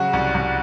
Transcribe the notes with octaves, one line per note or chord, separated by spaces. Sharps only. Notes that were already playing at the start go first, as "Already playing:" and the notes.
Already playing: C#3 F#3 F#4
C2
C2